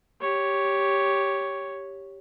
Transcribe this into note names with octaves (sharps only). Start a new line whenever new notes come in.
G4 C#5